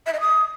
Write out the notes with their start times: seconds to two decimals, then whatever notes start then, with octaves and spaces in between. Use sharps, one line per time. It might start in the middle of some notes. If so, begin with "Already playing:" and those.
0.06 E5
0.13 D#5
0.20 D#6